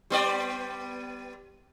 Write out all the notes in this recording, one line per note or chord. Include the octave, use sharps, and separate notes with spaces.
G3 B3 D5